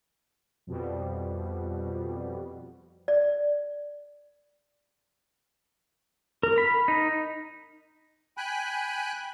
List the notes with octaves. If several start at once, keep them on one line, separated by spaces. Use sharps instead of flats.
F2 B2 G3
D5
A#4
B5
D#4
G5 G#5 B5 F#6